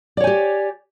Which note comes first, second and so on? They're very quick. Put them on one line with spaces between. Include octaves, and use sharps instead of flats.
D5 C#5 G#5 G4